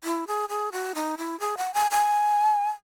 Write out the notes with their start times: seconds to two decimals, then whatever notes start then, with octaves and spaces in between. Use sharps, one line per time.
0.04 E4
0.28 G#4
0.49 G#4
0.72 F#4
0.95 D#4
1.18 E4
1.40 G#4
1.57 F#5
1.74 G#5
1.91 G#5